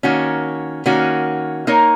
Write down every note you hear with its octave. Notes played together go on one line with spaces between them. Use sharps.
D#3 A#3 C#4 F#4
D#3 A#3 C#4 F#4
A#3 D#4 A#4 C#5